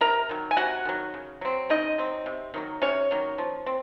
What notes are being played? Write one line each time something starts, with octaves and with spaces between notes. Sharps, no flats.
C3 A#4 A#5
D#3 F#3
G#5
C3 F#4 F#5
D#3 F#3
C#3
F#3 C4
C#3 D#4 D#5
F#3 C4
C3
D#3 F#3 A#3
C3 C#4 C#5
D#3 F#3 A#3
F3
C4